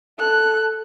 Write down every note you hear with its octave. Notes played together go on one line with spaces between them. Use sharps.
A4 F#6